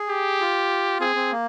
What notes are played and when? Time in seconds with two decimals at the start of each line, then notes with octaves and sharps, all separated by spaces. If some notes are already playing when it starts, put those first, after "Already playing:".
Already playing: G#4
0.09 G4
0.41 F4
1.00 C4 G#4
1.16 C4
1.32 A#3